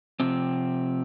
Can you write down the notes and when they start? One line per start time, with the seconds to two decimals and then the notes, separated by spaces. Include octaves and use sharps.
0.20 C3 F3 C4